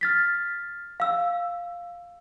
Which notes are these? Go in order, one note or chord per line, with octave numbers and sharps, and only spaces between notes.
F6 A6 B6
F5 E6